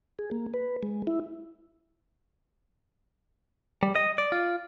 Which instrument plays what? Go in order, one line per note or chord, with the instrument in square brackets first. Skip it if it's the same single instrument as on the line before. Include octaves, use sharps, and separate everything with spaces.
[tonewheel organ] G#4
A#3
B4
G#3
E4
[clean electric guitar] G3
D#5
D5
F4